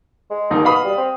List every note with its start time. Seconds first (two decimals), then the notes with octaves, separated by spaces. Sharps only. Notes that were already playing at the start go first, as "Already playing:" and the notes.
0.30 G#3
0.50 D#1 D#2 D#4
0.65 B2 F5 B5 D#6
0.85 G3
0.97 C4